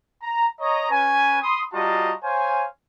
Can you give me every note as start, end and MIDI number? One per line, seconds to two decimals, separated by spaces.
0.22 0.46 82
0.60 0.90 73
0.60 0.90 75
0.60 0.90 82
0.90 1.41 61
0.90 1.41 71
0.90 1.41 80
1.42 1.62 83
1.42 1.62 84
1.42 1.62 87
1.74 2.13 55
1.74 2.13 65
1.74 2.13 66
1.74 2.13 75
1.74 2.13 81
1.74 2.13 82
2.24 2.66 72
2.24 2.66 73
2.24 2.66 77
2.24 2.66 80